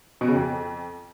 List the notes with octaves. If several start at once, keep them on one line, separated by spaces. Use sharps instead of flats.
B2
C#3
F2